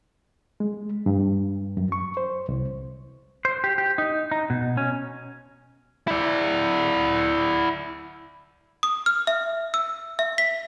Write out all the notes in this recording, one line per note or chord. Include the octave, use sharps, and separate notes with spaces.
G#3
G2
F#2
C#6
C5
C2
C5
G4
G4
D#4
D#4
B2
C#4
E4 D5
D#6
F6
E5
E6
E5
B6